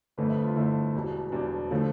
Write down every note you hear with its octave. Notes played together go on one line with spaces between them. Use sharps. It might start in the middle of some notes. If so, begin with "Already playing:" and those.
G1 F2 D3 A3 B4
E5
F4
G1 F2 D3 A3 E4
E1 E2 B2 G3
E1 E2 B2 G3 D4
D3 F3 A3